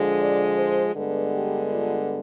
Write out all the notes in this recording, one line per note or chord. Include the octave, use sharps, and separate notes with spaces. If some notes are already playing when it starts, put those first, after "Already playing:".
Already playing: D3 F3 G#3
D5
C5
G2 D3 G#3 B3 B4
G4
F4